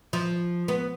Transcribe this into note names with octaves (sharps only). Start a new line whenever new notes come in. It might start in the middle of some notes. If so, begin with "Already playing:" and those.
F3
B3